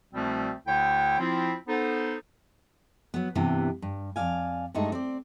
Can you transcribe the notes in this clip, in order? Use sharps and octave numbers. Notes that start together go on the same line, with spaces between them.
C2 B2 F3 G3 A3 C4
D2 D3 E4 C#5 G5
F3 C4 E4 F4
B3 D#4 A4 C5
F#3 B3
G2 C3 E3 B3
G2
F2 G#2 D5 F5 G#5
G2 G#3 A3 D#4
C4 C5 D5